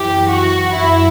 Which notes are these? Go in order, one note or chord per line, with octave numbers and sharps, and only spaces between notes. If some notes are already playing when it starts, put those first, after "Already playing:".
Already playing: F#2 E3 G4
F#4
F#2 F#3 E4